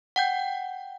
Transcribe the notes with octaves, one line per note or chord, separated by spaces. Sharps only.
F#5 G5 G6